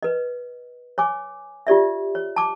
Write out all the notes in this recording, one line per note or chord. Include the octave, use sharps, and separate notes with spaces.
B4 D#5
C#5 G#5 D6
F4 G4 D5 E5
C#5
A5 D6